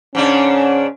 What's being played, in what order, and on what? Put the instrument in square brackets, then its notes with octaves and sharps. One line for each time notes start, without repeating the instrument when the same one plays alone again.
[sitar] G#2 C#3 D4 [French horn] C#4